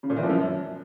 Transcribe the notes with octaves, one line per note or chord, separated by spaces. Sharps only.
C#3
A#2
E3
F3
F#2